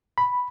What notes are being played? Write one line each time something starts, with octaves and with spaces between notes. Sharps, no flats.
B5